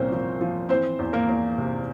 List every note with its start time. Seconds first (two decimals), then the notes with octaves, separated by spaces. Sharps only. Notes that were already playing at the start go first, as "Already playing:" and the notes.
Already playing: C2 A#2 C4 C#4 C5
0.12 F3
0.41 F3
0.69 E3 C4 C5
0.99 E2
1.13 A#3 A#4
1.29 E2
1.58 C3